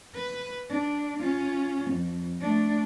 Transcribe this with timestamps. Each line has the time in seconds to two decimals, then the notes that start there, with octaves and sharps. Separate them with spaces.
0.14 B4
0.69 D4
1.19 C#4 F4
1.90 F2
2.40 A3 D4